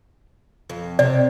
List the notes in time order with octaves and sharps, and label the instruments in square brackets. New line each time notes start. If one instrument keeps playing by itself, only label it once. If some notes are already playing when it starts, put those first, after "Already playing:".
[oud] F2
[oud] C3 [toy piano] D5